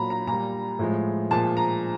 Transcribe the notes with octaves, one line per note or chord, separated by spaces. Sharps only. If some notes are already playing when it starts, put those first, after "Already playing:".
Already playing: A#2 F#3 A#5 B5
A#5
A#2 G3 A#5
A2 F3 G#3
A#2 F3 G#3 A5
A#5